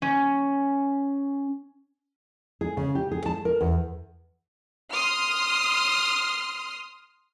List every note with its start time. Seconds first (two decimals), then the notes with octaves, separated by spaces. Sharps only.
0.02 C#4
2.61 G#4
2.77 C#3
2.95 G4
3.12 G#4
3.26 A5
3.45 A#4
3.61 E2
4.91 C6 D#6 F6